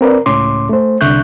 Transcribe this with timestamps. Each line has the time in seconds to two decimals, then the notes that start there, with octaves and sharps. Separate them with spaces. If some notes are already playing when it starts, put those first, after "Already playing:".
0.01 C4 A#4 B4 D5
0.26 C#2 A2 C#4 C6 D6
0.69 A3 C5
1.01 C2 D3 E5 C#6 F#6 G6